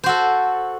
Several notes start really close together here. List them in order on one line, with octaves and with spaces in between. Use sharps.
C5 F#4 A4